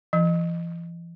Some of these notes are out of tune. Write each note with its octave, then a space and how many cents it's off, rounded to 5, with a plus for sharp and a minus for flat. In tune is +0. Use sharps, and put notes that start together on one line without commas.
E3 +45